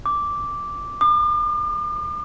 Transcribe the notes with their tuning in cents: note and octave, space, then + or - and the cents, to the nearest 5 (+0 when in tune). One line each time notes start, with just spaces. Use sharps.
D6 -5
D6 +45